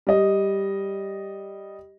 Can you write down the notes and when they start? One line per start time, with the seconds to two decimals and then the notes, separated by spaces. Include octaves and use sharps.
0.07 G3 D#5